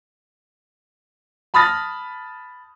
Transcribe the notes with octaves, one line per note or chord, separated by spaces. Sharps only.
A5 B5 D#6 F6 A6 A#6